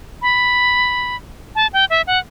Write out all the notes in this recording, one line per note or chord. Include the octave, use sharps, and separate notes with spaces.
B5
A5
G5
E5
F#5